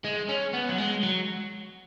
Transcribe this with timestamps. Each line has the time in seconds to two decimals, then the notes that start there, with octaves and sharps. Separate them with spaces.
0.04 G#3
0.29 C#4
0.54 B3
0.69 F#3
0.78 G#3
1.03 F#3